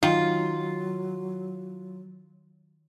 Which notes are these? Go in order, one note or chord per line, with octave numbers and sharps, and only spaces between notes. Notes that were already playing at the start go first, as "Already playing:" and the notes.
D#3 F#3 F4